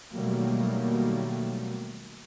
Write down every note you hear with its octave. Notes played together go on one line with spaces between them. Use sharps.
B2 D#3 F#3 G3 A3 A#3